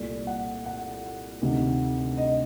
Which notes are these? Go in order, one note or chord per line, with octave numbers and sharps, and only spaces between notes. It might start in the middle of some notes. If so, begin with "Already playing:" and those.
Already playing: C2 A#2 A3 D5
F#5
F#5
D2 C3 D#3
D#5